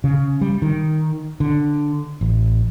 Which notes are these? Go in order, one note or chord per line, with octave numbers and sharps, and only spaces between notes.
C#3
G3
D#3
D3
A1